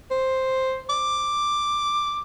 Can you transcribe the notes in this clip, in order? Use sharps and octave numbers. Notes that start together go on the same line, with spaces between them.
C5
D6